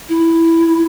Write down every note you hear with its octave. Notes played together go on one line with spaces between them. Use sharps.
E4